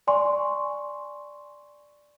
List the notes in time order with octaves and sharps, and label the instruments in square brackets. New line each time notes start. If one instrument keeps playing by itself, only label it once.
[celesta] D5 G#5 C6 C#6